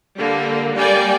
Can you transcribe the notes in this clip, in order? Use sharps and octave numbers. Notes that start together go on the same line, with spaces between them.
D3 G3 A#3
G3 A#3 D5 G5 G#5